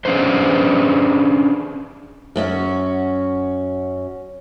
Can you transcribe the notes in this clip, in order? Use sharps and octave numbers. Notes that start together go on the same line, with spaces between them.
C#4 D4 G#4 B4 C5
F#2 C#4 F#4